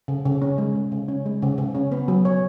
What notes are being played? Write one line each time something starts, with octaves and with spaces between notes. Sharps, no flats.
C#3
C#3
C#4
G#3
C#3
C#3
C#4
G#3
C#3
C#3
C#4
B3
F#3
C#5